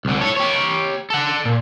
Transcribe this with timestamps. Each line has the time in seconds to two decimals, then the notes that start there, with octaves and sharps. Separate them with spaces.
0.05 C2 D3
0.21 A4 C#5
0.37 G4 C#5
1.10 A4 F#5
1.45 A#2